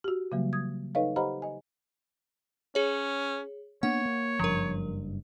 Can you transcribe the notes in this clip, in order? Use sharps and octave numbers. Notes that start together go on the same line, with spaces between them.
F#4 G4
C#3 E3 F#3 G3 A#3
D#6 G#6
D#4 A4 B4 C#5 D#5 F5
G4 C5 D#5 F#5 A#5 B5
D#5 G#5
C#4 G#4 C#5
A#3 B3 D4 C#5 F#5
A#3
F#1 G2 F3 A#4